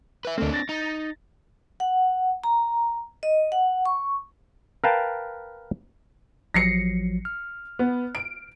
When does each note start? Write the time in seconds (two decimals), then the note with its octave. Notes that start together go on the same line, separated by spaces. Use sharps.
0.25 B4 E5
0.38 D2 A3 C4 D4
0.54 A6 A#6
0.69 D#4
1.80 F#5
2.44 A#5
3.23 D#5
3.52 F#5
3.85 C#6
4.84 A#4 B4 F5 G5 A5
6.54 A1 F3 F#3 A#6 C7 C#7
7.25 F6
7.79 B3
8.15 D7